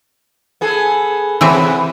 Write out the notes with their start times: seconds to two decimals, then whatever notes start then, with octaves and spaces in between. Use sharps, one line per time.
0.61 B3 G#4 A4
1.41 C3 E3 B3 C4 E5